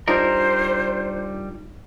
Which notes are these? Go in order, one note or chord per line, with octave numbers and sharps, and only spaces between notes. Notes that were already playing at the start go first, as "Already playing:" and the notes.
G3 D4 D#4 F4 A#4 C5